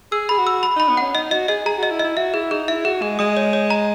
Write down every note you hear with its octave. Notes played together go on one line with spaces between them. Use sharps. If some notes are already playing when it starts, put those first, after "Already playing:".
G#4 E6
G#4 B5
F#4
E6
B5
D#4 B5
B3
C#4 F#5
D#4 D#5
F#4 D#5
G#4 D#5
G#4 A#5
F#4 D#5
E4
D#5
E4
F#4 E5
E4 G#4
D#4 G#4
E4 E5
F#4 G#4
G#3 G#4
G#3 D#6
C#5
C#5
A#5